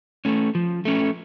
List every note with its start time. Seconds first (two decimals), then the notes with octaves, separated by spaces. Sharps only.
0.25 A3 C#4
0.55 F3
0.85 A3 C#4